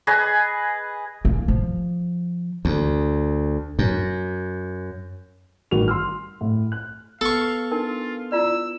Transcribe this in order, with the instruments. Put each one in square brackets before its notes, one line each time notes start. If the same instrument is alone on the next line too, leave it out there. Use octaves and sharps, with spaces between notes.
[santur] G#4 B4 D#5
[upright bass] A#3
F3
[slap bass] D2
F#2
[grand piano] A1 D#3 G3 F#4 F7
C6 E6 F6
A2
F#6
[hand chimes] B3 [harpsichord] A4 C#6 [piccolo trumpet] F5
[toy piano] D4 D#4 A#4 [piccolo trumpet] F4
[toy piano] E4 F4 D5 [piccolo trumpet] E6